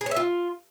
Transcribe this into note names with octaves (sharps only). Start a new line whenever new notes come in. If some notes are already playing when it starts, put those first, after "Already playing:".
G#4
C#5
E5
F4